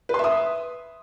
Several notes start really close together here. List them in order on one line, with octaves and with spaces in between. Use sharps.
B4 C6 E5 D#6